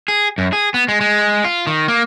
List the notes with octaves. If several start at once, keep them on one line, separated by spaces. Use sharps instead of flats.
G#4
F#2
G#4
B3
G#3
G#3
F4
D#3
A#3